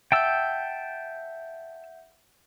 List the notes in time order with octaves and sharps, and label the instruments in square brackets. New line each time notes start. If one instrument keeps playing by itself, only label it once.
[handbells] E5 F#5 G6 [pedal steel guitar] G5 A5 E6